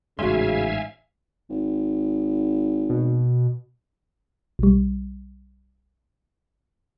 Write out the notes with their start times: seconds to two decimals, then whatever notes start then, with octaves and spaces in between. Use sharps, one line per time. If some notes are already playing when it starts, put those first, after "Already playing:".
0.19 A1 G#2 C#3 F#4 E5 F5 G#5 C6
1.49 G#1
2.90 B2
4.59 B1 G3